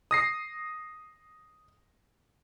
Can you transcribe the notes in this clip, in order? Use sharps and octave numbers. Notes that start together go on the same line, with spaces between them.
D#6 A#6 C7